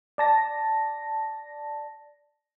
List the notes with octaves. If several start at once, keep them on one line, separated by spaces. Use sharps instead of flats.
D5 A5 A#6